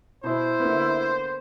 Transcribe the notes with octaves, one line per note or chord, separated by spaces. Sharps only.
B2 E4 C5
D3 A#3 B3